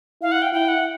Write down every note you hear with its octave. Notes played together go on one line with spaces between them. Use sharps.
E4 F5
F#5
G5
E4 G5
F#5